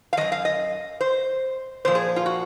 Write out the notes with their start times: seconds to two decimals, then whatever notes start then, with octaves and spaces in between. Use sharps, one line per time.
0.13 F5
0.17 F#2 F3 D#5
0.32 F5
0.45 D#5
1.01 C5
1.85 A#2 F3 C5
1.95 G#4
2.16 F4
2.26 F#4